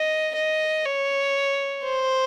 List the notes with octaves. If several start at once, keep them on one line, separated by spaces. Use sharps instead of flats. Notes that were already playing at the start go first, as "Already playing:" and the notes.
Already playing: D#5
D#5
C#5
C5